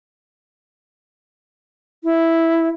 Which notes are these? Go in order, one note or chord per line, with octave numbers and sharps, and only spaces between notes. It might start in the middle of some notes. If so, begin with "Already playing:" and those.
E4